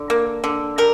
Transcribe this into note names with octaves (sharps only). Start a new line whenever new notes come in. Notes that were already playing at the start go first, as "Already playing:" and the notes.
Already playing: D3
A#3
D3
G3 A#4